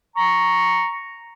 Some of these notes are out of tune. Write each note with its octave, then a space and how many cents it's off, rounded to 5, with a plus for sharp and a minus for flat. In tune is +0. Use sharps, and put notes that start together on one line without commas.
A#5 +0 C#6 +0